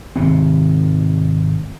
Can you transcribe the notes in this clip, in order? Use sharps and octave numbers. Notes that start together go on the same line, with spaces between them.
G#1 C3 C4